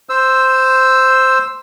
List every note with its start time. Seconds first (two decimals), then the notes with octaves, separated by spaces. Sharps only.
0.09 C5 E6